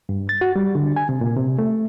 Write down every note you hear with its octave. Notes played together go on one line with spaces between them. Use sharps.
G2
A6
F#4
G3
D3
G#5
C3
A#2
C3
A3